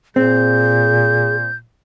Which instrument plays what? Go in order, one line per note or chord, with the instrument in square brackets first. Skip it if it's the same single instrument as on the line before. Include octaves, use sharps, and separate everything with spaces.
[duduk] A#2 [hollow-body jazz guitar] C4 [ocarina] G#4 [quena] G6